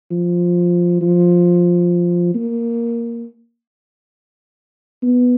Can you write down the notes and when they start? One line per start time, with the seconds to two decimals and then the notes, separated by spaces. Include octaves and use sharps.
0.11 F3
1.01 F3
2.35 A#3
5.03 B3